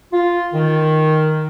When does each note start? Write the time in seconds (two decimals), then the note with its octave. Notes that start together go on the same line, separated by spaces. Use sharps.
0.13 F4
0.53 D#3